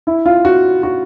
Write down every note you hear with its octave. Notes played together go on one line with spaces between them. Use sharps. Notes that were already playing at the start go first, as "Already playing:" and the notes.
E4
F4
F#4
F#4